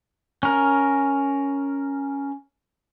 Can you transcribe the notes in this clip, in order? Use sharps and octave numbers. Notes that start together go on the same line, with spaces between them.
C#4 A#4